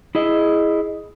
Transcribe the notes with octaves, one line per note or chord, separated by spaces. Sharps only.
E4 G#4 D#5